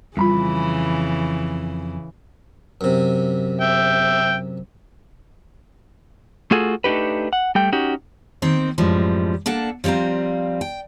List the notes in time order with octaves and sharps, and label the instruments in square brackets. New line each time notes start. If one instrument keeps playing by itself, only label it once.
[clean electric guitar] F2 A#5 B5 [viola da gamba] C#3 E3 [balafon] G3 F4
[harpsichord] F#2 C3
[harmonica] E5 G5
[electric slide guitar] A3 F4 F#4 G#4 A4
A3 D4 D#4 G4 B4
F#5
G3 A3 G5
C#4 D#4 F#4 G4
[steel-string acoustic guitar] D#3 A#3 C4 C5
F#2 A2 F3 G3 G#3
A#3 D4 A4 F#5
F3 G3 C4 F5 A#5
G5